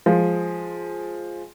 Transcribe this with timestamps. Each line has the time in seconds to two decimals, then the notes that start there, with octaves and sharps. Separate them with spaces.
0.06 F3 G#3